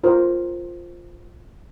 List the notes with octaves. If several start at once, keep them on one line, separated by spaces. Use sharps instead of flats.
F4 A#4 C5